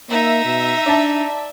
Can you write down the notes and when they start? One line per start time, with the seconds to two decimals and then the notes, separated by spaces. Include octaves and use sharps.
0.10 A#3 D#4 E5
0.45 B2
0.86 D4 D5 A5